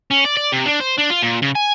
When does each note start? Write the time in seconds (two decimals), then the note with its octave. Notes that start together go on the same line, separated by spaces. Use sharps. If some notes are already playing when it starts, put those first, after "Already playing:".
0.11 C#4
0.25 D5
0.37 D5
0.52 C3
0.66 D4
0.80 C5
0.98 D4
1.11 F4
1.23 A#2
1.42 C#3
1.55 G#5